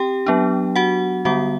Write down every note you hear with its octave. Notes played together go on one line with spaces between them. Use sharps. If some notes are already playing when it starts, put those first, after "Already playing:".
Already playing: C4 G4 G5
F#3 B3 D4
F#4 F#5
D3 G3 B3 F#4 F#5